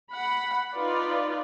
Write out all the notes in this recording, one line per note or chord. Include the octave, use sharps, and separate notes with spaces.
F#5 B5
D#4 F4 B4 D5